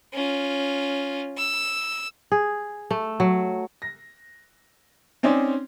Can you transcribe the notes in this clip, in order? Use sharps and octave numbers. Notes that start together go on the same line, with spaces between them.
C#4 F4
E6
G#4
A3
F#3
A#6
C4 C#4 D#4 C5 D5